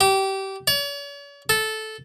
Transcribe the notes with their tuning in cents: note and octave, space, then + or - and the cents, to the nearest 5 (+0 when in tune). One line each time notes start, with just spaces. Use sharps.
G4 -20
C#5 +45
A4 -10